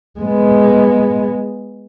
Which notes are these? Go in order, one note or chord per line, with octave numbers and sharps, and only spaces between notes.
G#3 B3